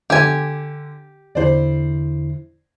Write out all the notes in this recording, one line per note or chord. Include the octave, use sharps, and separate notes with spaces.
D3 G4 G#5
E2 D3 E4 C5 D5